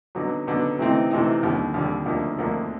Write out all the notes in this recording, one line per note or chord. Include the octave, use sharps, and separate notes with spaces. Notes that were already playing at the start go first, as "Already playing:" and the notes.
D3 F#3 B3 D#4
D3 F#3 B3 D#4
C3 E3 A3 C4 D#4
C3 E3 A3 C4 D#4
D#2 D3 G3
D#2 D3 G3
D2 D3 F3 A#3 D#4
D2 D3 F3 A#3 D#4